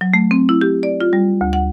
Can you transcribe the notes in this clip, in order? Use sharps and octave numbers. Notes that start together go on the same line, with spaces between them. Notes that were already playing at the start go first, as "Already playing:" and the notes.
F#3
A3
C4
E4
G4
D5
F4
G3
D2
F#5